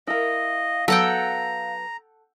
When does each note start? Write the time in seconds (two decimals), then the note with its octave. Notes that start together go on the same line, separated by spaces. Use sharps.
0.07 E4 A#4 D#5 F5
0.88 F#3 B3 A4 F#5 G5 A#5